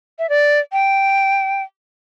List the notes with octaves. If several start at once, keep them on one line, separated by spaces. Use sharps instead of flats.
E5
D5
G5